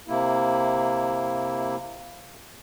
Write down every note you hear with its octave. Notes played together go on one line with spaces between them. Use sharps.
C3 A#3 E4